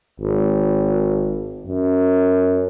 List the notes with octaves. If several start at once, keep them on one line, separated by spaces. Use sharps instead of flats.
G#1
F#2